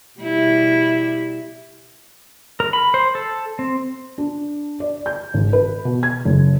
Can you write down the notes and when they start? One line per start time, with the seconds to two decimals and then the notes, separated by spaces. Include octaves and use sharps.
0.19 B2 G3 E4
2.60 A#4
2.73 B5
2.94 C5
3.15 A4
3.59 C4
4.18 D4
4.80 D5
5.06 G6
5.34 G#1
5.53 B4
5.85 B2
6.03 G#6
6.25 F#1